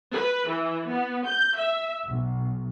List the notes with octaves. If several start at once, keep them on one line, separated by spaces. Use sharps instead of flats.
B4
E3
B3
G6
E5
B1